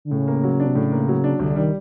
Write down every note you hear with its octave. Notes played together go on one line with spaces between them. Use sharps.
D3
A2 C#3
A#3
F#3
D4
C3
A2 C#3
A#3
F#3
D4
C2 D3
D#3 G3